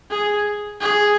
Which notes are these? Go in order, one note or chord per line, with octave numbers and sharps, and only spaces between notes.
G#4
G#4